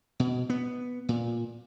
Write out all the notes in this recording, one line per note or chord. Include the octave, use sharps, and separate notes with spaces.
B2
B3
A#2